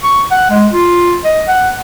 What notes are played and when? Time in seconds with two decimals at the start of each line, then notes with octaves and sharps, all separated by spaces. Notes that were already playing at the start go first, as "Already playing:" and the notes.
0.04 C#6
0.31 F#5
0.51 G#3
0.74 F4
1.25 D#5
1.48 F#5